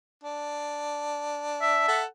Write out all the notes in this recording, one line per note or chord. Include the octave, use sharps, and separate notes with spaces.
D4
E5
A4 F#5 A5